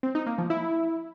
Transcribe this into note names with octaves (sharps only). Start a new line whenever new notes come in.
C4
D#4
A#3
F3
E4